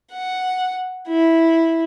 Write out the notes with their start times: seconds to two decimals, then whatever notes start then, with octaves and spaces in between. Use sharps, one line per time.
0.13 F#5
1.08 E4